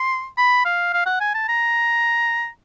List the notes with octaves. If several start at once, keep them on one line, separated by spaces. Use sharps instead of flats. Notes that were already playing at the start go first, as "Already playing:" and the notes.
Already playing: C6
B5
F5
F5
F#5
G#5
A5
A#5